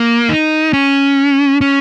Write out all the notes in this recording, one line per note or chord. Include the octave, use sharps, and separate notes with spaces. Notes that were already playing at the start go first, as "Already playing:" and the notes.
Already playing: A#3
D#4
C#4
C#4